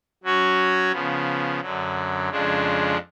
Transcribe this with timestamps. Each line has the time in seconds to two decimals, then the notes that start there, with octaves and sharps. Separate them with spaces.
0.24 F#3 C#4 F#4 C#5
0.91 C#3 F3 B3
1.60 F#2 D3 F#3
2.29 F2 C#3 F3 G#3 D4